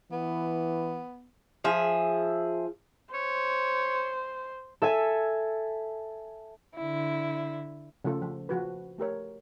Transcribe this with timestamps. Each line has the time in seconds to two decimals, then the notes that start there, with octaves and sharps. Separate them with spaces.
0.12 E3 B3
1.64 F3 G#4 E5
3.14 C5 C#5
4.82 A4 E5 G#5
6.75 D3 E4
8.04 C#3 F3 A3 F4 A4
8.22 F3
8.49 F3 F#4 B4
8.98 A3 G4 A#4 C#5